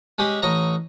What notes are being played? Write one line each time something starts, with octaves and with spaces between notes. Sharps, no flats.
G#3 C#4 G4
A1 C#5 D#5 A#5